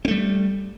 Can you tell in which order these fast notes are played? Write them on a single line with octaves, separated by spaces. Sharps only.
C4 A3 G3